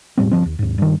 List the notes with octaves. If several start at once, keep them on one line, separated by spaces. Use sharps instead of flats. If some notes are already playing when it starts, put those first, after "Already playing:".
E1 A2 G3 C4
G1 F3 C4
D#2
D#2 G#2
G2 D#3